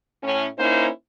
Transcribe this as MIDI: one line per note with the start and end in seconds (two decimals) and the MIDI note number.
0.23 0.46 45
0.23 0.46 61
0.59 0.88 58
0.59 0.88 61
0.59 0.88 63
0.59 0.88 64
0.59 0.88 72